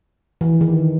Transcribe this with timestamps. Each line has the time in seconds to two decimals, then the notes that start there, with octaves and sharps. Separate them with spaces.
0.41 E3
0.61 D#3